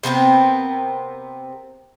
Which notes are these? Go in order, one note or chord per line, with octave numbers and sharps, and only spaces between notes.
C3 B3 C4 A#4